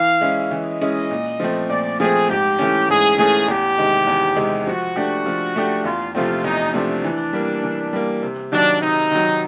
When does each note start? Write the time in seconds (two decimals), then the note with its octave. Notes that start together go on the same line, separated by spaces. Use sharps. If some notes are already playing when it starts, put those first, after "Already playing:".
Already playing: E3 F5
0.21 G#3 C#4 E4
0.51 E3 D#5
0.81 G#3 C#4 E4
1.11 A#2
1.40 F3 A3 C4
1.69 A#2 D5
1.99 F3 A3 C4 G#4
2.29 G#2 G4
2.59 E3 A3 C#4
2.89 G#2 G#4
3.18 E3 A3 C#4 G#4
3.48 E2 G4
3.78 C3 D#3 G#3
4.07 E2
4.36 C3 D#3 G#3
4.67 F3 F#4
4.96 A3 D4 G4
5.26 F3
5.56 A3 D4 G4
5.85 E2 F4
6.14 C3 F3 A3 C4 F4
6.44 E2 D#4
6.74 C3 F3 A3 C4 D4
7.04 E3
7.33 G3 A#3
7.63 E3
7.93 G3 A#3
8.23 C3
8.52 D#3 F#3 D4
8.82 C3 D#4
9.11 D#3 F#3